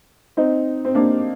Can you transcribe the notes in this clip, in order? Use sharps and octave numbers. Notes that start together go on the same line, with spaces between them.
C4 D#4
C4
A#3 D4